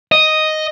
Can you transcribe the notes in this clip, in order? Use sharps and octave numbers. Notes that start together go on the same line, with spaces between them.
D#5